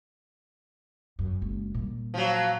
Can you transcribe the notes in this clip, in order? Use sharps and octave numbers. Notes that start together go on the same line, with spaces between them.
F#2
F#1 G#3
A#2 G3
F3 F#3